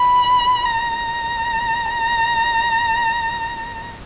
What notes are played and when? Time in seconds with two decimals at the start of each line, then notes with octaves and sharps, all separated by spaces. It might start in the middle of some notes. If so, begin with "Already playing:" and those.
Already playing: B5
0.65 A#5